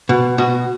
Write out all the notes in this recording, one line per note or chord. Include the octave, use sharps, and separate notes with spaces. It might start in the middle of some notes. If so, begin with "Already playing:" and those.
B2
B2 F#4